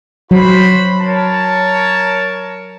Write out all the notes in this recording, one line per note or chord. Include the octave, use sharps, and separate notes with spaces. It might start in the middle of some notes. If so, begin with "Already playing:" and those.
F#3 F#4 C5 B5
A#4 C#5 A5